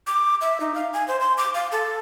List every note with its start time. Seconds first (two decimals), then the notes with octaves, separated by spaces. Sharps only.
0.07 D6
0.41 E5
0.60 D#4
0.75 F5
0.93 G#5
1.08 C5
1.20 C6
1.38 D6
1.54 F5
1.72 A4